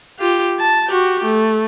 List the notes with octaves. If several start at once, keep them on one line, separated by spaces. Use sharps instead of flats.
F4 G4
A5
F#4 G4
A3